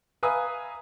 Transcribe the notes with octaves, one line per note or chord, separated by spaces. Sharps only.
B4 E5 F5 G#5 A#5 D#6